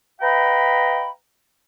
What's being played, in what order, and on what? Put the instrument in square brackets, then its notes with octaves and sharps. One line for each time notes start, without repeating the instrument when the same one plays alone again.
[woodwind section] B4 D#5 F5 G5 A#5 B5